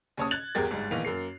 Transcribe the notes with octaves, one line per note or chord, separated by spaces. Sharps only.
D#2 C#3 C#5 A5 D#6
F#6 G#6 A6 F#7
G#1 E2 G4 G#4 A#4 A6
G1 G#2 G3
A#1 D#3 E3 B3 F5 F7
F#2 A#3 C7